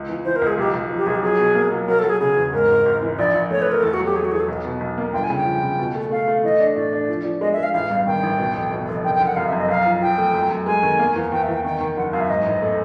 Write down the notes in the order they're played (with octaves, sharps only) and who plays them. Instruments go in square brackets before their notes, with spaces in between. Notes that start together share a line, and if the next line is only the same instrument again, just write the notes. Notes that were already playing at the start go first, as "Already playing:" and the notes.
Already playing: [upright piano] C#2
E3
[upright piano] E3 [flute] C5
[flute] A#4
[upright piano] C#2
[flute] G#4
[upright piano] B1 [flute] G4
[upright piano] B1
F3
[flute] G4
[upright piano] B1 [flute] G#4
[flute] G4
[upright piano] F#3 [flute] G#4
[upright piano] B2
A#3
F#3
[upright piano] F#3 [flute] A#4
[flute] A4
[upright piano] F#3
[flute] G#4
[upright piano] C#3 [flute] G#4
[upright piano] E2
[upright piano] G#2 [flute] A#4
[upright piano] G#1
G#1
E3
[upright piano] A#1 [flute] D5
[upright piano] A#1
[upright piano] A3 [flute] C#5
[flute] B4
[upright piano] A3 [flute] A#4
[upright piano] E2 [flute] A4
[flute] F#4
[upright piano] F#3
[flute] G4
[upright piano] A3 [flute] G#4
[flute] F#4
[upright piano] E2 [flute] G#4
[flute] A4
[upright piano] B1
B2
B1
A#3
[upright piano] G1 [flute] G5
[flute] G#5
[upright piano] C#3
[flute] G5
[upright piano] F3
C#3
B2
A3
[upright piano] A3 [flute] F5
[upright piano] A3
[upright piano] E3 [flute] D#5
[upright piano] D4
[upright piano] A2 [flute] D5
[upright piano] D4
F3
F3
[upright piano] G#3 [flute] D#5
[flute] E5
[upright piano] G#3
[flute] F5
[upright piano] A1 [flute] F5
[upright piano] G2
[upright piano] D#3 [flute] G5
[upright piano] A1
B2
F1
B2
F1
[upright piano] F#1 [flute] G5
[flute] G5
[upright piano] F#1
[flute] F#5
[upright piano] F#2 [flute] F5
[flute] E5
[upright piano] F#2
[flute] D#5
[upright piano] B1 [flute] F5
[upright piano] F3
[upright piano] F3 [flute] G5
[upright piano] A3
F#2
F#2
[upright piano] G#3 [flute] G#5
[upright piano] D#3
A#3
E2
[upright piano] E2 [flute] G5
[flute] E5
[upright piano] E2 [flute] G5
[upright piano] D#3 [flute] G5
[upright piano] D#3
[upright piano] F#1 [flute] F#5
[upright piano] F#2 [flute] F5
[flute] E5
[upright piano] G#2 [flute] D#5
[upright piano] A1
A3